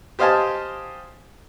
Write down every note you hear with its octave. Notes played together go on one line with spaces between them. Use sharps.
G4 C5 D#5 F5 G#5 A5